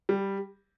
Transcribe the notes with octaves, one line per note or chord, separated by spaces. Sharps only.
G3